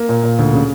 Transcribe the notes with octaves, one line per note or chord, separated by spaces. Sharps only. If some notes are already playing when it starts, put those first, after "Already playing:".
Already playing: A#3
A#2
A#2
D2
C#3